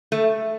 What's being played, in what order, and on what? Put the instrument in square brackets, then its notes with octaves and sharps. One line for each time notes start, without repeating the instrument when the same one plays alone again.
[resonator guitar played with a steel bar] A3